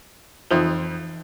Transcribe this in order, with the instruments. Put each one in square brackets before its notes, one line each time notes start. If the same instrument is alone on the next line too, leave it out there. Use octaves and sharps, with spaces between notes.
[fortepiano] F2 C5 [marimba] E3 D#4 F4